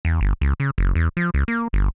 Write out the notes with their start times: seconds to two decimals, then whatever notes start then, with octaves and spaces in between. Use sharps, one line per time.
0.05 E2
0.21 G1
0.41 C#2
0.60 C#3
0.78 F#1
0.95 E2
1.17 F3
1.34 C#2
1.48 A#3
1.73 G1